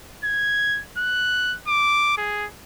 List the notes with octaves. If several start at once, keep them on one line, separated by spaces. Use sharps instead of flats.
G#6
F#6
D6
G#4